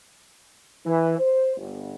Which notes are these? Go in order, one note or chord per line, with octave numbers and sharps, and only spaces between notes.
E3
C5
G1